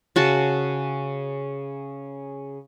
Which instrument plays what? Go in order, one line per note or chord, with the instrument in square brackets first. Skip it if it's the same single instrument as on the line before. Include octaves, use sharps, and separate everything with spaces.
[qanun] C#3 F#4 A5